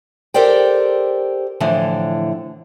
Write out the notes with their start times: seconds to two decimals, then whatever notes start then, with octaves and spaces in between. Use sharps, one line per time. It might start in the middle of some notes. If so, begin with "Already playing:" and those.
0.34 G4 A4 A#4 C5 D5 G5
1.60 A2 D3 E3 F3